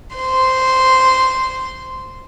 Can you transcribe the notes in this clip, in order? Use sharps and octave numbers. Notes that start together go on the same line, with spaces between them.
C5 C6